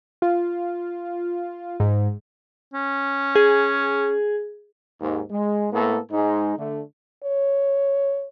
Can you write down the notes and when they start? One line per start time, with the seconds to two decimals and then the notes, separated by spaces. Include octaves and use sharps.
0.22 F4
1.80 G#2
2.74 C#4
3.35 G#4
5.01 D#2 G#2
5.30 G#3
5.72 A2 A#3 B3 A4
6.12 G#2 G#3 D#4
6.57 D3 A3
7.24 C#5